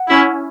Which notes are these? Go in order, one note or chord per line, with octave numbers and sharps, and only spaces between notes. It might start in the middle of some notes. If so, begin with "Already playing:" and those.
Already playing: F#5
C#4 E4